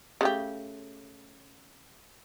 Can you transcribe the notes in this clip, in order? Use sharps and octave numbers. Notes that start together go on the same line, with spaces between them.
C#3 A3 G4